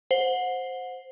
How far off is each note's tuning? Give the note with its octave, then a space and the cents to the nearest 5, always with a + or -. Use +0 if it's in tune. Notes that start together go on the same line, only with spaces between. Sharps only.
C5 +0 F#5 -25